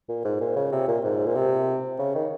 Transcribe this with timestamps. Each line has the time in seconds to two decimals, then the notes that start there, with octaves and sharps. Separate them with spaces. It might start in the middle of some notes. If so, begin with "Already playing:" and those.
0.09 A#2
0.24 G#2
0.40 A#2
0.56 C#3
0.72 C3
0.88 A#2
1.04 G#2
1.26 A#2
1.35 C3
1.99 C#3
2.15 D#3